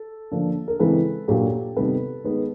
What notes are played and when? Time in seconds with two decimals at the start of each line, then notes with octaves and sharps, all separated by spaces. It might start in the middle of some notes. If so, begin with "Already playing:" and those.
Already playing: A4
0.32 D3 F3 A#3 D4
0.68 A#4
0.79 C#3 E3 G#3 C4 A4 B4
1.28 A#2 F#3 A#3 D4 G4 A4
1.76 C3 D#3 G3 B3 A4 B4
2.24 D#3 G#3 B3